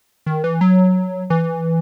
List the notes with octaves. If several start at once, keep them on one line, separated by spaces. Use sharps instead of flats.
D#3
E3
F#3
E3